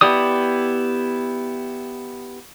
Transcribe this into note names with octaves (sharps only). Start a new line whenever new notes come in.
B3 E4 G4 D5 D#6